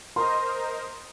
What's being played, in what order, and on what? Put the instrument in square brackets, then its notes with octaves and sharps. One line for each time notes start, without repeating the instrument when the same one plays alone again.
[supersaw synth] A#4 C5 D#5 [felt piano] C6